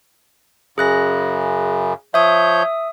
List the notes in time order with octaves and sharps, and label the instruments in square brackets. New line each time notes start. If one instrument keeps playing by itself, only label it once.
[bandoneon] F#2 C#3 [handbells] G#4 F#6 A#6
[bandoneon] F3 C#5 G6 [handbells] E5 D#6